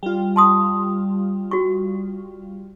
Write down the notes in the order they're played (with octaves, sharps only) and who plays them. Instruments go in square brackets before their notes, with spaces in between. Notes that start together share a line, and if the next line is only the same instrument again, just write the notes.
[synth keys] G3 F4
[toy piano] A5 C6 D#6
F#4 C#6